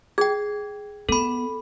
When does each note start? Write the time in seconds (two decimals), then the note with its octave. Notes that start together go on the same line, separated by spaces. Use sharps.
0.18 G#4 G5 G#6
1.09 B3 A4 B5